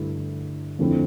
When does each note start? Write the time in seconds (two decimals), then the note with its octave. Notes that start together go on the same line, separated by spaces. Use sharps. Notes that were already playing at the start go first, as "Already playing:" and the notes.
Already playing: G2 D3 A3 E4
0.79 F2 D3 A3 C4 E4